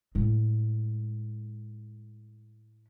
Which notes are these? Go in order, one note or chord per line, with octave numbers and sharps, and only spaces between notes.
A2 G#3